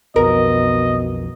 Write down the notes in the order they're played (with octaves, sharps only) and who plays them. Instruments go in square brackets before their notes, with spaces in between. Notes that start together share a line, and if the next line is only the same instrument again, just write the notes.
[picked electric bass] B1 F2 [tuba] B2 [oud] A#4 [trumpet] D#5